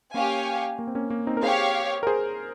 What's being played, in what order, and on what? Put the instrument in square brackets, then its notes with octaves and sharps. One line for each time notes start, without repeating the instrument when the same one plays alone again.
[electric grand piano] A#3 C#4 [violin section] G4 C#5 F5 G#5
[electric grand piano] A#3
C4
A#3 C#4
A#3 C#4
C4 D#4
A#4
[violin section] G4 C#5 F5 [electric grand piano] G#4 C5
[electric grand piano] A#4
G#4 C5